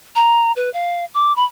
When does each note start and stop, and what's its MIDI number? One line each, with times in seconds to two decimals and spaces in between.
0.16 0.52 82
0.56 0.72 71
0.74 1.05 77
1.14 1.35 86
1.36 1.45 83